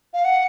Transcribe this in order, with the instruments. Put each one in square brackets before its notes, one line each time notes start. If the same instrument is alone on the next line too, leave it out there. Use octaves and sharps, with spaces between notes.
[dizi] F5
F#5